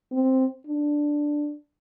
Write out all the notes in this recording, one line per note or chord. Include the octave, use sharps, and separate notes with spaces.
C4
D4